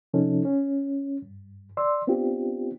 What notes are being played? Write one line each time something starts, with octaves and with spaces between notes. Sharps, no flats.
C3 F3 C#4 D#4 A4
C#4
G2
D5 C6 E6
B3 C4 D4 F4 G4